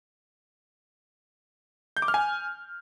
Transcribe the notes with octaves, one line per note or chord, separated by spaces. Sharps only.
G6
D6
F6
G#5